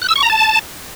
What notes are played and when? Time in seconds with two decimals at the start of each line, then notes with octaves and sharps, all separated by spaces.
0.02 F#6
0.09 E6
0.16 C#6
0.23 A#5
0.30 A5